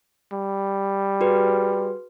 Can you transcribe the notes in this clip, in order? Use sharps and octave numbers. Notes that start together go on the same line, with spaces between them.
G3
F#4 G#4 B4